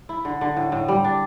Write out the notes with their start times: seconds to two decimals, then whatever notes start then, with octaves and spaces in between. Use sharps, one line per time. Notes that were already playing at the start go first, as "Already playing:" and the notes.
0.09 E4
0.25 D3
0.41 D3
0.56 A2
0.72 A2
0.88 G3
1.04 D4